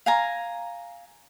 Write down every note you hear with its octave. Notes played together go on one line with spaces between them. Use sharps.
F5 G#5 A#5